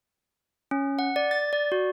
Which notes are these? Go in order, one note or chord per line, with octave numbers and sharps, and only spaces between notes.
C#4
F#5
D5
A6
D5
F#4